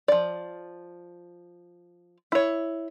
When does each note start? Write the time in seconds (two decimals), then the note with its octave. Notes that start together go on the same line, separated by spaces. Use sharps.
0.08 F3 D5
2.32 E4 C#5